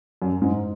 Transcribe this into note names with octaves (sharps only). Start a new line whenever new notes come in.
F#2
G#2